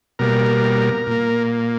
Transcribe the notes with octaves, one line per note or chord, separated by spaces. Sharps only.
B2 G3 A#3 A#4
A#2 A#3